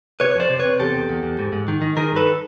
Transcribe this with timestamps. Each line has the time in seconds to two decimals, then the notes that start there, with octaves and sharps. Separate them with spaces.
0.20 C3 B4 C#5
0.31 C#5
0.36 F2 C5 D5
0.50 C3
0.59 B4 C#5
0.65 C3
0.79 E2 G4 A4
0.95 E2
1.09 E2
1.23 E2
1.39 G#2
1.53 G#2
1.68 D#3
1.82 D#3
1.97 D#3 G#4 A#4
2.12 G2 A4 B4